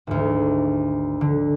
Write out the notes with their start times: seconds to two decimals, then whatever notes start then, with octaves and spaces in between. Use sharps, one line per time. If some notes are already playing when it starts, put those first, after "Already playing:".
0.07 G#1 D2
1.21 D3